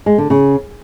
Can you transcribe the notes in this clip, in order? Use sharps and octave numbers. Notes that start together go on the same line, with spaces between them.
G#3
D3
C#3